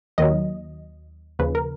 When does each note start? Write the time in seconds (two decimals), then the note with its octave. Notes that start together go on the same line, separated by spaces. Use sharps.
0.18 D#2 D#3 F#3 D#5
1.39 D#2 C#3 F3 B4
1.55 A#4